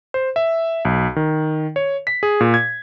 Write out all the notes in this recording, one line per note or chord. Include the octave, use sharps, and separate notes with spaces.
C5
E5
B1
D#3
C#5
B6
G#4
A#2
G#6